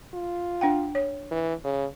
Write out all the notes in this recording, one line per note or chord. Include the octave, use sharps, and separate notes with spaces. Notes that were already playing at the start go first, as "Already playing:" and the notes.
F4
D4 F#5 G5
C#5
E3
C#3